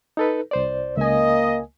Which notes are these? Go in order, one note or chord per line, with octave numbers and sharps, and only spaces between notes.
D#4 A4 B4
C2 C5 D5
C#2 A#3 D#5 G#5